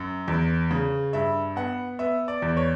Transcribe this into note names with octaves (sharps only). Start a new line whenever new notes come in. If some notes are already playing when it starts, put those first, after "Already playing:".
Already playing: F#2
E2
C#3
G2 E5
B3 F#5
B3 E5
D5
E2
C#5